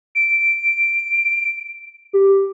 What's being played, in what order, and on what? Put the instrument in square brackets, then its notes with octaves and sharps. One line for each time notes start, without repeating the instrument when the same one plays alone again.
[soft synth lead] D7
G4